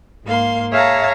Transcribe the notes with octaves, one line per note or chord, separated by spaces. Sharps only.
G#2 A#3 F5 C6
G#4 C#5 E5 F5 A5 A#5